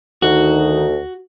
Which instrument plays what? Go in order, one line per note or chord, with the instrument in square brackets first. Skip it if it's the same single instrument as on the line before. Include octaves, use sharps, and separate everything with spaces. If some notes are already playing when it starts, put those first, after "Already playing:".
[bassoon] D2 [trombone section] D#3 D#4 [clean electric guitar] F#4